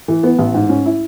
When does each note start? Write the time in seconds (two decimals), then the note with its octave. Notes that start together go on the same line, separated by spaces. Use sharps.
0.08 E3
0.23 B3
0.39 A1
0.54 G#2
0.69 C#4
0.86 E4